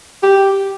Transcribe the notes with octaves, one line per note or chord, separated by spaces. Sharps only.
G4